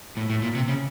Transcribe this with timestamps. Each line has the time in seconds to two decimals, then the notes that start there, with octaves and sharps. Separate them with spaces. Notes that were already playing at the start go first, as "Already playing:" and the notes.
0.17 A2
0.30 A2
0.42 A#2
0.55 C3
0.68 C#3